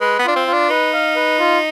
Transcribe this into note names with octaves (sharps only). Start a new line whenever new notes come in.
G#3 B4
B3
D4 F4
C4
F4
D4
D#4 B4
F5
B4
F4